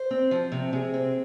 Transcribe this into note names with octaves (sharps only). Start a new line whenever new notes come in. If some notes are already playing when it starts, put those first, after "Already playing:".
Already playing: C5
C4
F3
C3
C3 G#4
C4